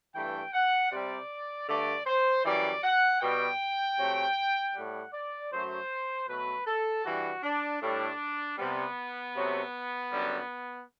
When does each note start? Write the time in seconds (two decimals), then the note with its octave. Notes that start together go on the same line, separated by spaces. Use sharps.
0.14 G2 E3 A3 G5
0.53 F#5
0.91 C3 G3 D5
1.67 G2 D3 A3 D5
2.06 C5
2.44 F#2 E3 G3 D5
2.83 F#5
3.21 B2 G3 G5
3.98 C3 F#3 A3
4.74 A2 G3 F#5
5.13 D5
5.51 F#2 F#3 A3 C5
6.27 B2 F#3 A3 B4
6.66 A4
7.04 G2 E3 G3 F#4
7.43 D4
7.81 A2 G3 D4
8.58 C3 G3 B3
9.34 C3 F#3 A3
10.11 F#2 D3 G3